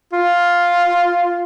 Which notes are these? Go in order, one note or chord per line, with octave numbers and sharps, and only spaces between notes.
F4